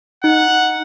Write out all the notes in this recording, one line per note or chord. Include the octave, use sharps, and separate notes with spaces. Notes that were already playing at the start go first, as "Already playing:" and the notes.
D#4 F#5